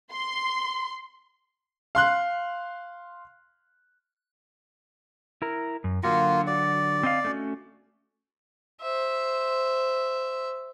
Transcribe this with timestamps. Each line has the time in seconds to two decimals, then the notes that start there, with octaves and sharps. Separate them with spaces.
0.11 C6
1.95 F5 C6 F#6
5.42 E4 A#4
5.84 F#2
6.03 D3 F#3 A#3 F4 F#4
6.47 D5
7.03 C4 D#5 F5
7.24 A3 C#4 F#4
8.82 C5 E5